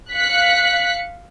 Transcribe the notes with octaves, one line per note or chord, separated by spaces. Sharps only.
F5 F#6 B6 C#7